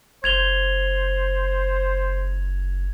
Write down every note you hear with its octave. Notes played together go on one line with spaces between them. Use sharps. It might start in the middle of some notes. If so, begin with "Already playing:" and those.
F#1 C5 G#6 F7 G7